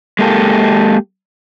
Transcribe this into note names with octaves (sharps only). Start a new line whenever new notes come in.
G#3 A#3 G4 A4